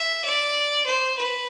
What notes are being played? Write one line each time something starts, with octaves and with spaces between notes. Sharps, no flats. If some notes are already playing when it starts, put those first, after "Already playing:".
Already playing: E5
D5
C5
B4